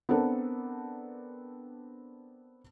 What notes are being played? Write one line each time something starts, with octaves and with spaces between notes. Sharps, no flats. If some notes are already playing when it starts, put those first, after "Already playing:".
B3 C4 D4 A4 A#4